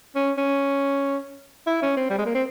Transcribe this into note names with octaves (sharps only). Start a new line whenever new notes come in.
C#4
C#4
E4
C#4
C4
G3
G#3
A#3
C4